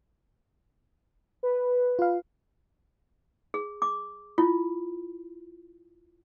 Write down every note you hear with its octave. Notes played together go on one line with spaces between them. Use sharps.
B4
F4 F5
G#4
D6
E4 F4